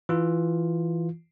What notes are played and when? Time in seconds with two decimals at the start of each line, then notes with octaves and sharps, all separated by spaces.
0.09 E3 F4